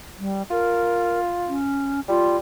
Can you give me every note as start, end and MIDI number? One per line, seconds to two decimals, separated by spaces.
0.20 0.43 55
0.51 1.57 65
0.51 1.20 70
1.48 2.01 61
2.09 2.38 55
2.09 2.37 65